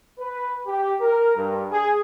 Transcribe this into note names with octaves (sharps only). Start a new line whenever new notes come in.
B4
G4
A#4
G2
G#4